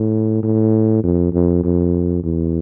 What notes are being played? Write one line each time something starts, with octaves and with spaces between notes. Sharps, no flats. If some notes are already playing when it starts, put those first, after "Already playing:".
Already playing: A2
A2
F2
F2
F2
E2